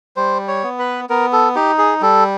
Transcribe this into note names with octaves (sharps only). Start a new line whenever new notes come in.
G3 C5
C#5
B3
B4
B3 A#4
A4
D#4 G4
G#4
G3 A4